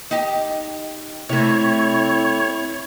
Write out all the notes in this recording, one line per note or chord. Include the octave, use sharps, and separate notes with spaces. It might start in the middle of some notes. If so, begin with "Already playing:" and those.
D#4 G4
C3 A3 E4 C#5